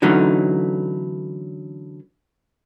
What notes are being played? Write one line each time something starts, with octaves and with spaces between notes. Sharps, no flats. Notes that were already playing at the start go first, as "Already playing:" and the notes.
D3 E3 F#3 A3 C#4 D#4